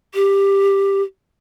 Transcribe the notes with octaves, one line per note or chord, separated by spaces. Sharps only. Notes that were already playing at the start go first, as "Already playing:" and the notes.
G4